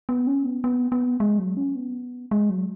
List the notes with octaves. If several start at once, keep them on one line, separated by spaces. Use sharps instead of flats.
B3
C#4
B3
B3
B3
G#3
F#3
C#4
B3
G#3
F#3